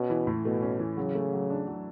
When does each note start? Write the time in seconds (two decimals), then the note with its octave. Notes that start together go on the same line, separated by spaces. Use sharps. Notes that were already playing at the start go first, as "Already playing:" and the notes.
Already playing: B2 C#4
0.10 E3
0.27 A2
0.44 B2 A3
0.62 C#4
0.79 E3
0.97 C#3 F#3
1.15 A3
1.33 F#3
1.50 D4
1.68 F#3